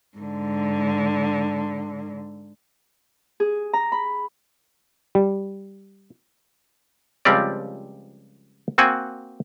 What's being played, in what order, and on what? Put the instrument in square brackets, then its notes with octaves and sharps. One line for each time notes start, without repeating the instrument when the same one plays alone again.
[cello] G#2 D3
[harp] G#4
A#5
B5
[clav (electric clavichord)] G3
C#2 F3 G3 C4 G4 D5
A#3 C4 F#4 F#5 G#5